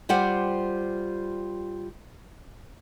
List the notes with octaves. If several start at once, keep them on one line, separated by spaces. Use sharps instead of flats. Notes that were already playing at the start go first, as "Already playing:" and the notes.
G3 F4 G4 C5 F#5